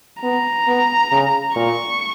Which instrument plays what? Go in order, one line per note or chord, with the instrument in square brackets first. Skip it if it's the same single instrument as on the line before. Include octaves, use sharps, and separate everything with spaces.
[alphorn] B3 [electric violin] A#5
[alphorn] B3
C#3
[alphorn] A#2 [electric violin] C#6